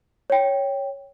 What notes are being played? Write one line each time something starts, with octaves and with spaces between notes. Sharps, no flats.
C#5 G5